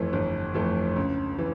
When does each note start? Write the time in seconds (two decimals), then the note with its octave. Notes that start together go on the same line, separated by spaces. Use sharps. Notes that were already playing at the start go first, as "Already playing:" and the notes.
Already playing: G1 F2 E3 A3
0.13 G1
0.54 F2 E3 A3
0.96 C#2
1.38 E3